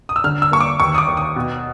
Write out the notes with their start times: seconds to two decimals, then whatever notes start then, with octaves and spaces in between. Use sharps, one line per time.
0.09 D#6
0.16 E6
0.24 D3 F6
0.42 E6
0.52 A#3 C#6
0.61 D6
0.80 D#2 C#6
0.95 D#6
0.98 D6
1.08 D#2
1.17 D#6
1.36 B2